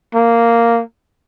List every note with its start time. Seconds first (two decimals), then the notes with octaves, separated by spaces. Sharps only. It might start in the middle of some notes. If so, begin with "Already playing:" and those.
0.15 A#3